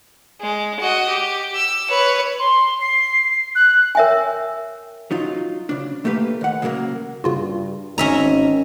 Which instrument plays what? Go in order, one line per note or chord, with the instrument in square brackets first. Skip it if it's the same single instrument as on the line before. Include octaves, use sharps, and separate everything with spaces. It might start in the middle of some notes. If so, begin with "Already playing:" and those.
[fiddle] G#3
F#4 D#5
G4
E6
B4 C#5
[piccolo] C6
C7
F#6
[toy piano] A#4 C#5 E5 G5 G#5
[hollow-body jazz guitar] F#3 D#4 F4
C#3 D4
A3 A#3 G4 B4
D#2 F#5
C#3 F#3 G#3 A#3 A#4
[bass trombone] G2 [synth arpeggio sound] C#3 F4 F#4
[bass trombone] G#1 [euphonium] D#3 [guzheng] C#4 E5 A#5